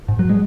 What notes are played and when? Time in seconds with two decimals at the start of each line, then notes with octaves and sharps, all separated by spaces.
0.08 G#2
0.19 F#3
0.29 G#3